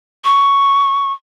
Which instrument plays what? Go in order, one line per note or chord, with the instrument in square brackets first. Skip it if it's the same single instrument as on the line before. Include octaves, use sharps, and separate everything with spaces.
[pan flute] C#6